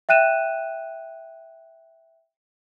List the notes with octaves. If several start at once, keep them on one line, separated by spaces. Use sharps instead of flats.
E5 G5 F#6 D#7 E7